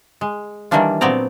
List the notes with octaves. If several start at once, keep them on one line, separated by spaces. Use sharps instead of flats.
G#3
D#3 E3 G3 A#3 D4 F4
A#2 F#3 B3 C4 D5 A#5